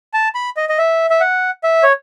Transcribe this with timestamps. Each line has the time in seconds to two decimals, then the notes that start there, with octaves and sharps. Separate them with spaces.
0.14 A5
0.35 B5
0.57 D#5
0.69 D#5
0.78 E5
1.10 E5
1.20 F#5
1.64 E5
1.83 C#5